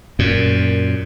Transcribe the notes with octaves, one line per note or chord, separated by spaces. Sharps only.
F#2 A#2